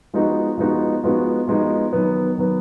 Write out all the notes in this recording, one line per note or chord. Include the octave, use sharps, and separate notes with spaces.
F3 G#3 B3 D#4 F#4
F3 G#3 B3 D#4 F#4
F3 G#3 B3 D#4 F#4
F3 G#3 B3 D#4 F#4
D#3 F#3 B3
D#3 F#3 B3